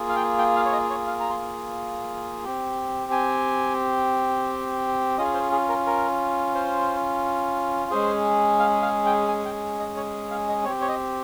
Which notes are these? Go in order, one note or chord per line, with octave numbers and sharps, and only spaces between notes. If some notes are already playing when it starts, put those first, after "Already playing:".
Already playing: A#3 F4 G#4
F5
G5
G5
F5
C#5
D#5
C#5
F5
A#5
C6
C4 G4
G#5
C#4 F4 G#4 D#5
C5
G#4
A#4
A#4
C5
G#3 C#4 G#4 C5
F5
F5
G5
G#5
G5
D#5
C#5
F5
D#5
C4 G4 C#5
C#5
D#5